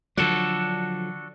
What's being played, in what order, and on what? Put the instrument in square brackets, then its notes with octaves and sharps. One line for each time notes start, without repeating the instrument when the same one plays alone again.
[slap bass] D3 F3 F#3 [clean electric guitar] D4 F#4 A4